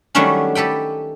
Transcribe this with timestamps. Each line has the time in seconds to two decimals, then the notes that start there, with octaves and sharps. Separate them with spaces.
0.15 D#3 F#3 G3 A3 C#4 D4
0.55 G4 A4 B4 G5